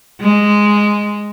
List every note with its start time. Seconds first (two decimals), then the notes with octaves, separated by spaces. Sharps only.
0.21 G#3